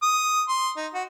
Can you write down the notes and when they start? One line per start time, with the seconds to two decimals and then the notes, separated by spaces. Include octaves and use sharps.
0.03 D#6
0.48 C6
0.77 D#4
0.94 F#4